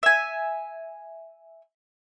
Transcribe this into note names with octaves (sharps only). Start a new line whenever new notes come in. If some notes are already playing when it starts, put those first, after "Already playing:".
E5 G#5